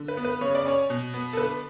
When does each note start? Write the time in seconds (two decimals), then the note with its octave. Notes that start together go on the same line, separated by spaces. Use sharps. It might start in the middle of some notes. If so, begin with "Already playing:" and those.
Already playing: D3
0.08 B4
0.17 B3
0.25 B4
0.41 C#3 C#5
0.55 D5
0.66 C#4 C#5
0.90 B2
1.14 B3
1.33 A4
1.37 D3 B4